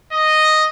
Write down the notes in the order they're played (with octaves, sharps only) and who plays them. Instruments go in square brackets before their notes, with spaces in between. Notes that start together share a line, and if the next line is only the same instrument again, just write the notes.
[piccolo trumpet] D#5